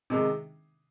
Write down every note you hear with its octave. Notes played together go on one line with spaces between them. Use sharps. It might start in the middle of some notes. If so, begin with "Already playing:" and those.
C3 D#3 G#3 D#4